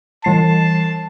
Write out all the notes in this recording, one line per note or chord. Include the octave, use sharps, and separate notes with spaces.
E3 G3 A5 C7